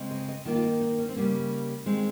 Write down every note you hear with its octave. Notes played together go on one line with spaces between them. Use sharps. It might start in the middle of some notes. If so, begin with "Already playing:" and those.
Already playing: C#3 G#3 C4
D#5
D#5
D#3 A#3 F4
F4
D#4
D#4
C#4
C4
C#3 G3 A#3 C#4
D#3 G#3 C4